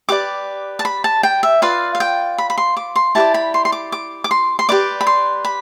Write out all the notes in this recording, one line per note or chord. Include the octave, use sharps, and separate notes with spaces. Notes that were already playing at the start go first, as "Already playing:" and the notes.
G4 B4 D5 D6
A5
B5
A5
G5
E5
F4 B4 D5 F5
F5
G5
B5
B5
C6
D6
C6
E4 G4 B4 D5 A5
B5
C6
C6
D6
D6
D6
C6
C6
G4 B4 D5 D6
B5
C6
B5